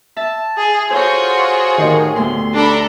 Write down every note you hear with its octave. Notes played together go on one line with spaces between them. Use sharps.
E5 A5
G#4
F4 F#4 G#4 A4 C5 C#5
A2 D#3 G4 C5
D2 B2 A3 C6
D4 A4 A#5 B5